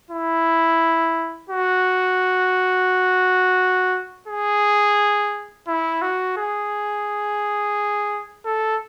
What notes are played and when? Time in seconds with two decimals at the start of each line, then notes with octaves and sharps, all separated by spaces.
0.10 E4
1.49 F#4
4.28 G#4
5.68 E4
6.02 F#4
6.37 G#4
8.46 A4